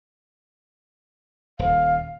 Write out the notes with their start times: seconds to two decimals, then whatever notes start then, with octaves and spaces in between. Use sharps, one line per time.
1.59 D#1 F5